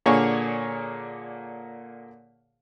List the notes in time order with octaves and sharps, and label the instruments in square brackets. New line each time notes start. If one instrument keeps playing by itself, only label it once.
[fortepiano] A#2 D3 A#3 G#4 C#5 C#6